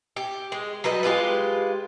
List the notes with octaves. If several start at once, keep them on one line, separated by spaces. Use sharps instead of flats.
G4
G#3
F#3 G3 B4 D#5
G#3 F4 G4 B4